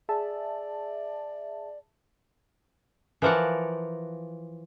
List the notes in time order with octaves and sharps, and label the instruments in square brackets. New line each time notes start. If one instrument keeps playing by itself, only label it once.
[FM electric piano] G#4 E5 A5 [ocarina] D5
[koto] E3 F3 A#4 D5 F#5